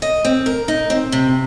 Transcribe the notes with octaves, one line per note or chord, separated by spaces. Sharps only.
D#5
C4
A#4
D#4
C4
C3